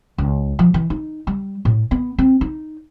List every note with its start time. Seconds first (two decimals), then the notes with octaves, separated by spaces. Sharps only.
0.18 C#2
0.59 F3
0.74 E3
0.90 D#4
1.27 G3
1.65 A2
1.91 B3
2.18 C4
2.41 D#4